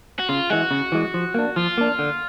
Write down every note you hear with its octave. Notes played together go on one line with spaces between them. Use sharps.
F#4
C#3 F4
E3 G#3 F#4
C#3
E3 G#3
F3
A#3 D4
F3 F4
A#3 D4
D3